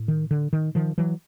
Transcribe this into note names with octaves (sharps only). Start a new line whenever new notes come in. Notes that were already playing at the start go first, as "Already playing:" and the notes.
Already playing: A2
D#3
D3
D#3
D#3 F3
E3 F#3